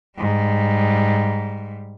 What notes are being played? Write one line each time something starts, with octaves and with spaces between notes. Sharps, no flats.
G#2 G3